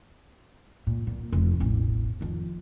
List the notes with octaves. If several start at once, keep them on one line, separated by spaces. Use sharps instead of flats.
A#2
A#2
F1 F3
E1 A1
F2 D#3